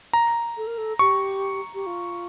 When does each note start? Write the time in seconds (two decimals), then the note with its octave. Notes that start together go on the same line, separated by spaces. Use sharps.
0.13 A#5
0.57 A4
0.67 A#4
0.78 A4
0.99 G4 C#6
1.74 G4
1.86 F4